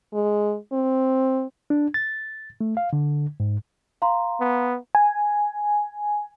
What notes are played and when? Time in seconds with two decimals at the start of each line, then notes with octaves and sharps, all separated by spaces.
0.14 G#3
0.73 C4
1.70 D4
1.94 A6
2.61 A3
2.77 F5
2.93 D3
3.40 G#2
4.02 F5 A#5 C6
4.40 B3
4.95 G#5